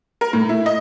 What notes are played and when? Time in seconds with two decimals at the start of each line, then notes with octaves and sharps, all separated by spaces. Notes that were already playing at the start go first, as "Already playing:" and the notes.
0.21 A#4
0.33 A2
0.49 E4
0.66 D#5